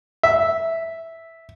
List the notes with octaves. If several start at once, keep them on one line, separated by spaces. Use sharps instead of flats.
E5